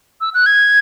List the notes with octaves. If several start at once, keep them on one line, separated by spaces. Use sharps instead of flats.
E6
F#6
G#6